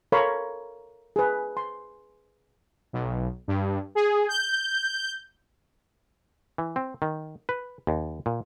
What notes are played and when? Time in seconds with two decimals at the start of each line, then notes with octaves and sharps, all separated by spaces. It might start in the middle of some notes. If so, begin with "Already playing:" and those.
0.12 A4 A#4 C#5 F5 B5 C6
1.16 G#4 B4
1.57 C6
2.93 B1
3.48 G2
3.95 G#4
4.28 G6
6.58 E3
6.76 C4
7.02 D#3
7.49 B4
7.87 D#2
8.26 A#2